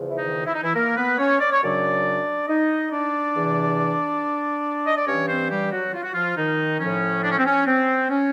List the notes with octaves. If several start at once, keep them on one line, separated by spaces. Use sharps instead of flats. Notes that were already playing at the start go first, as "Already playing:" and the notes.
Already playing: E2 C#3 F3
E4
D#3 D#4
E4
D#4
E3 E4
A#3 A#4
B3 B4
C#4 C#5
D5
C#5
F#2 C#3 F#3 D4 D5
D#4 D#5
D4 D5
E2 C3 E3
D#5
D5
G2 E3 C#4 C#5
C4 C5
G3 G4
F#3 F#4
F4
F#4
F3 F4
D#3 D#4
A2 F3 C#4
D4
C#4
C4
C#4
C4
C#4